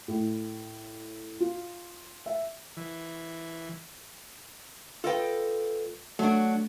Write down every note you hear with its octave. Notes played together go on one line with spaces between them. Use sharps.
A2
F4
E5
E3
F4 A4 B4 D#5 G5
F#3 A3 D4